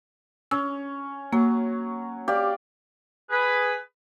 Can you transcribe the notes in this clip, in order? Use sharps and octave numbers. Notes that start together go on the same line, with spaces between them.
C#4 E6
F#3 A#3
G4 D5 F5
G#4 B4